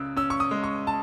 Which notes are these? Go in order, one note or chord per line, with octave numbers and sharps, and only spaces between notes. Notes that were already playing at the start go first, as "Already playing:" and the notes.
Already playing: C#2 C#3 E6 F#6
C#4 E6
C#6
D#6
G#3
C#6
A5